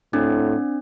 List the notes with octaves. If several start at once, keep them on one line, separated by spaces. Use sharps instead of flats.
A2 C4 D4